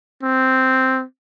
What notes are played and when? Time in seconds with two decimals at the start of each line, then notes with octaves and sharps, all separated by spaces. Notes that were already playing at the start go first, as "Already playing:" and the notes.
0.23 C4